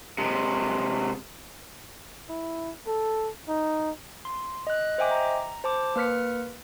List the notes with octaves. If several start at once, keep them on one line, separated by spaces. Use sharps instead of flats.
C3 G#3
E4
A4
D#4
C6
D#5 F#6
C5 D#5 E5 G5 G#5 D6
A#5
C5 A5 D6
A#3 B4 F6 B6 C#7